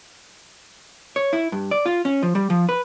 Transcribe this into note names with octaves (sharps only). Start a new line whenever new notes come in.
C#5
E4
G2
D5
F4
C#4
F3
G3
F3
B4